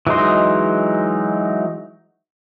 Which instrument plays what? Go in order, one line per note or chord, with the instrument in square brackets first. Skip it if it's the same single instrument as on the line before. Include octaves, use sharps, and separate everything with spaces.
[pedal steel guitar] E3 F#3 G#3 D#4 C6